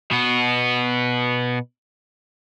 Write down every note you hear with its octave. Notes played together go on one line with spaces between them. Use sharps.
B2 B3